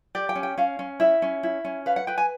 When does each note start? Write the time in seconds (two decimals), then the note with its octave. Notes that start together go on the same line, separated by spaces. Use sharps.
0.15 G4 D5
0.29 G5
0.35 C#4
0.43 G5
0.58 C#4 F5
0.79 C#4
1.00 E4 E5
1.22 C#4
1.43 E4
1.65 C#4
1.86 B4 F5
1.96 F#5
2.07 B4 G5
2.18 G#5